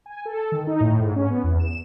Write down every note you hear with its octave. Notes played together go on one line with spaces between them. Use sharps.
G#5
A4
D#3
D#4
A2
G#2
C#4
B3
E2
E7